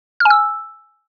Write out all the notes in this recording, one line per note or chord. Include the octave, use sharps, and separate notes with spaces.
F6
G#5
E6